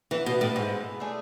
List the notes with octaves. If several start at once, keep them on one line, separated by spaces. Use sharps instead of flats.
E3 B3 E4 B4
B2
A2
G#2 G#3 B3 E4
A3 D4 G#4